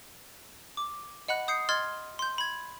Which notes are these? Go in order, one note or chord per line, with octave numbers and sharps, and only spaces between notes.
D6
D#5 F#5 B5 F#6
D#6 G6 C7 C#7
D#5 C6 F6 G#6 A6
C6 G6
B5 G#6